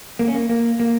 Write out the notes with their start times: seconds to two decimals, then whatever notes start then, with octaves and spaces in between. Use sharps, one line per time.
0.19 A#3
0.28 C#4
0.35 A#3
0.49 A#3
0.80 A#3